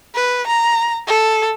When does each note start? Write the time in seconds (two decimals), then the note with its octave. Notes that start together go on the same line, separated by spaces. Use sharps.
0.15 B4
0.47 A#5
1.07 A4